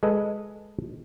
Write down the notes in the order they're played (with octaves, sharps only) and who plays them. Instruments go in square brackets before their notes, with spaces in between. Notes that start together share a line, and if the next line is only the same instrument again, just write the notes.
[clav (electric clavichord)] G#3 A4 B4 D#5